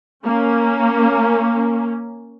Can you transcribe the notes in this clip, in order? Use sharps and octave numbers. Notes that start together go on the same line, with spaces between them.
A#3 C#4